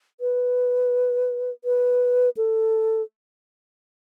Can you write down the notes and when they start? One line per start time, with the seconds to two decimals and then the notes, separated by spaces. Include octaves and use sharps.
0.21 B4
1.64 B4
2.37 A4